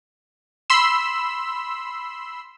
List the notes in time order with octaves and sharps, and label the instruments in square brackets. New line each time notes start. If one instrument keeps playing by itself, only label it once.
[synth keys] B5 C6 E6